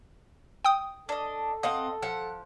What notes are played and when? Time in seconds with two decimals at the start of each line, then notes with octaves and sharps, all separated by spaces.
0.65 G5 D#6
1.09 D4 A4 D#5
1.63 C4 D#5 F5 F#5
2.03 F3 F#5